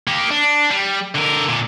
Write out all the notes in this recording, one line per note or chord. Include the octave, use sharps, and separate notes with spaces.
A#3 G4
D4
G3
D3 A#4
A#2 D3